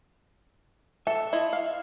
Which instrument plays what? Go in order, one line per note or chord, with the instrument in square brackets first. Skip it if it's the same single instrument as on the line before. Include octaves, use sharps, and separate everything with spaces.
[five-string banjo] A4 [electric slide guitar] E5
[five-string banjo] E4 F4 D#5
F5